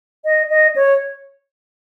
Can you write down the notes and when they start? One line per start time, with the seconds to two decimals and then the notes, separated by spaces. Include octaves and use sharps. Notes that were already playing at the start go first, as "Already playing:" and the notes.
0.25 D#5
0.49 D#5
0.76 C#5